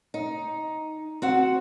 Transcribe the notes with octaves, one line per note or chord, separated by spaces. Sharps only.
D#4
C4 F#4 F#5